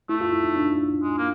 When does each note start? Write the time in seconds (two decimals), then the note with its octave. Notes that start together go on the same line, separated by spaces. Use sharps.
0.09 A3 E4
0.21 F4
0.33 E4
0.43 D#4
0.56 D4
1.03 G#3
1.18 A#3